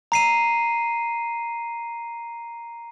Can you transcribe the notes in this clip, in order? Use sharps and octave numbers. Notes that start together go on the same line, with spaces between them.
A#5 C7 D#7